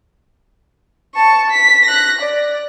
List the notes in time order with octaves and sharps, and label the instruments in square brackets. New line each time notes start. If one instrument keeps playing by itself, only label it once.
[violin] A5 C#6
B6
F#6 A#6
D5